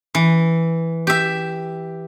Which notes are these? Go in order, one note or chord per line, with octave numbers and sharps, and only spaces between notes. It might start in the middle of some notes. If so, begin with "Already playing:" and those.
E3
G4 E5